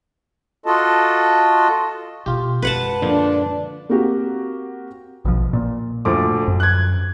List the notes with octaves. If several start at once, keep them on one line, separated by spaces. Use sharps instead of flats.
F4 F#4 A4 D#5 A5
B2 C4 F4 G4
F#2 G#3 B4 F#5 A5
A#2 D3 F3 D4
A#3 C4 F#4 G4
A#1 B2 F3
A#2
D2 F3 D6
F#2
F#6 G#6